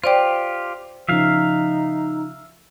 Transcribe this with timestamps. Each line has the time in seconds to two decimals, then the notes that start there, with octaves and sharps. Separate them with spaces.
0.04 F4 G4 C5 D5 G5
1.09 C#3 F3 D#4 E5 F5